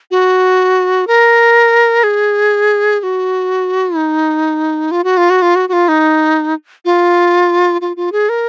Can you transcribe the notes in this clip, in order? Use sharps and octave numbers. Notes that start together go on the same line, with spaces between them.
F#4
A#4
G#4
G#4
F#4
D#4
F4
F#4
F4
F#4
F4
F#4
F#4
F4
D#4
F4
F4
F4
G#4
A#4